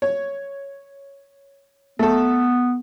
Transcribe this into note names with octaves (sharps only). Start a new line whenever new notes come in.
C#5
A3 B3 A4